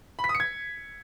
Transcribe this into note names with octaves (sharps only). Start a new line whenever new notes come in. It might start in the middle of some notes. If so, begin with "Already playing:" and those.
B5
B6
D#6
C#7
G#6